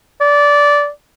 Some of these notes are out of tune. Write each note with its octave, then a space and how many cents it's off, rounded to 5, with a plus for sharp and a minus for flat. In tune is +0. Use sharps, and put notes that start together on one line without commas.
D5 -15